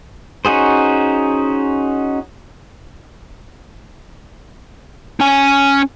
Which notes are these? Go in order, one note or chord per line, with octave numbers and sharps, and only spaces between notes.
C#4 D#4 F#4 G#4 C5
C#4 G#5